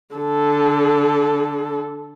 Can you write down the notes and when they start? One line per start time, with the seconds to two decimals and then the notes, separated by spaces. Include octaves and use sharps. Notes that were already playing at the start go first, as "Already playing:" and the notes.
0.16 D3 A4